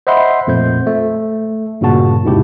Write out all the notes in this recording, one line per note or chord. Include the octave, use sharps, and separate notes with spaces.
C5 D#5 E5 F#5 B5 C6
F2 A#2 A3 C5 G6
A3
G2 A#2 C#3 A#3 F#4 A5
E2 G#2 C3 E4 G4